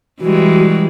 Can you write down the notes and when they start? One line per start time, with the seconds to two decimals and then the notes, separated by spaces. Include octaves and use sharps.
0.21 E3 G3 G#3 F#4